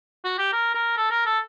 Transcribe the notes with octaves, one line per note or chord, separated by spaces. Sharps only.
F#4
G4
A#4
A#4
A4
A#4
A4